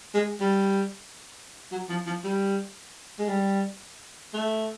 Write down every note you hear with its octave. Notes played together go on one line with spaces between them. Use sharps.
G#3
G3
F#3
F3
F3
G3
G#3
G3
A3